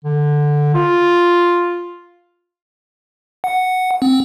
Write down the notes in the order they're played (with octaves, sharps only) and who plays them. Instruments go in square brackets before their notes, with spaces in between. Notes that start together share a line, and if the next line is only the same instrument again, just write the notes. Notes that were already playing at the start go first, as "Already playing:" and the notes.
[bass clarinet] D3
F4
[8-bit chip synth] F#5
C4